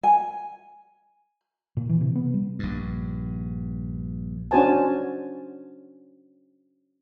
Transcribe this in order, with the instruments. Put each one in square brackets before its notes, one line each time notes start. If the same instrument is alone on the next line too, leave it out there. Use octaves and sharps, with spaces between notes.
[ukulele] G#5
[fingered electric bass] A#2
E3
C3
B3
G3
[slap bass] A#1 G2
[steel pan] C#4 D4 F#4 C5 G#5 A5